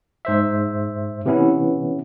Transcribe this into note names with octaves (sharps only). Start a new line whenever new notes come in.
G#2 C5 E5
C3 E3 B3 C#4 E4